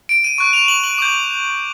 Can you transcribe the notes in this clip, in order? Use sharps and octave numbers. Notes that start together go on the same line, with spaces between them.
D7
D#7
C#6 F#6
F7
F#7
F#7
D6 G6